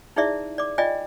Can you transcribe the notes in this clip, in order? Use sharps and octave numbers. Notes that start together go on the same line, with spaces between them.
D#4 E4 G#4 D5 E5
D5 D6
F4 D5 D#5 G5 G#5